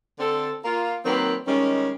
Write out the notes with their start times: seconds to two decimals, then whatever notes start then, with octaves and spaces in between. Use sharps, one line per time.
0.19 D3 C4 A4
0.65 A#3 F4
1.05 D#3 F#3 A#3 C4 B4
1.47 D#3 G3 G#3 C#4